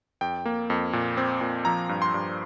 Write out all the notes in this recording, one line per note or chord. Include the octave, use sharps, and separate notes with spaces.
F2 G5
A#3
F2
A#2
C4
A#2
F3 A#5
G2
C6
G2